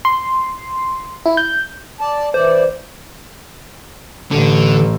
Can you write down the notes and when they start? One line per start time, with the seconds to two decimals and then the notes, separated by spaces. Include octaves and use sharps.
0.05 C6
1.26 E4
1.37 G6
2.00 D5 A5
2.34 E3 C5 D5
4.31 A1 D3